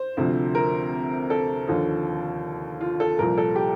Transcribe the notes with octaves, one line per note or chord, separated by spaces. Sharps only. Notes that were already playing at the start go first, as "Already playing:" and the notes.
Already playing: C5
D2 C3 F3
A#4
A4
D#2 D3 F3
F4
A4
C2 A#2 F3 A#4
A4
G4